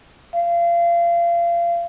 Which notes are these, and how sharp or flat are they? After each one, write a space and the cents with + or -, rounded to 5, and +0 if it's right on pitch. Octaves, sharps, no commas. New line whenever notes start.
F5 -30